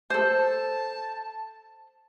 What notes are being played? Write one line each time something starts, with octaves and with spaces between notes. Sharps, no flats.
A4 C5 A5